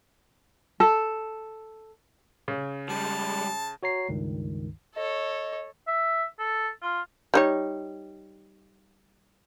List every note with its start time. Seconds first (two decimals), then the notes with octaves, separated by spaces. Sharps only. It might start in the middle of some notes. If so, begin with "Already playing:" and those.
0.80 A4
2.48 C#3
2.89 G3 G#3 A5
3.83 F#4 C#5 A#5 C7
4.09 C#2 G2 D#3
4.96 A4 C#5 D#5
5.87 E5
6.39 A4
6.82 F4
7.34 G3 D#4 C#5